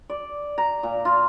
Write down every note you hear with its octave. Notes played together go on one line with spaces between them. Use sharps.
D5
A#5
A#2
F4